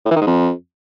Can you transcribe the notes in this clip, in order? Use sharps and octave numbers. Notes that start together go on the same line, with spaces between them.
A2
E3
D#3
G#2
F2